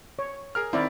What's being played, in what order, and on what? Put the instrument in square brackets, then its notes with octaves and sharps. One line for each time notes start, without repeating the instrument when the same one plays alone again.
[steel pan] C#5
[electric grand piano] G#4 A#4 F6
[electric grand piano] D#3 C4 [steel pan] E4 D5